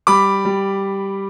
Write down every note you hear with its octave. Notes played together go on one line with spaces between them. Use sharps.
G3 B5 D6
G3